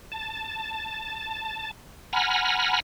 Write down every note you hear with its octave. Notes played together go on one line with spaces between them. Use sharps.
A5
F#5 G#5 A#5 B5 F6